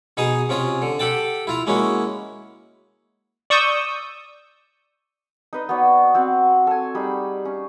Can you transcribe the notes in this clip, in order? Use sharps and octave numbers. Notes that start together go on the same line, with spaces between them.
B2 D#4 G#4 A#5 D#6
C3 C#4 F4 D#6
D3
G4 A4 F#5 G5 A5
E4 F4 A#5
G#3 A#3 C#4 E4 F#4
D5 C#6 D#6 E6 G6
D#4 B4 D#5
B3 F#4 C#5 D5
C4 F#4 F#5
A4 G#5
G3 D#4 G#4 B5
C#4